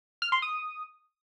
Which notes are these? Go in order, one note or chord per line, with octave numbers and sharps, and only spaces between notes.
F6
C6
D#6